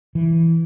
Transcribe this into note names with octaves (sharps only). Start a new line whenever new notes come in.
E3